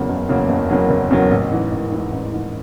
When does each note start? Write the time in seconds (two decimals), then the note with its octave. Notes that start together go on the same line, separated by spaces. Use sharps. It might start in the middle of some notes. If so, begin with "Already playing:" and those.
Already playing: E2 C#3 F#3 A#3
0.09 F#1
0.29 E2 C#3 F#3 A#3
0.49 F#1
0.70 E2 C#3 F#3 A#3
0.90 F#1
1.11 E2 C#3 F#3 A#3
1.31 A1
1.51 G#2 E3
1.71 A1
1.92 G#2 E3
2.12 A1
2.33 G#2 E3